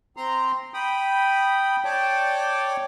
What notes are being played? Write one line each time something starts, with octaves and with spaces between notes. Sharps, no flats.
C4 A#5 C6
G5 B5 D#6
C#5 D5 G5 A5 D6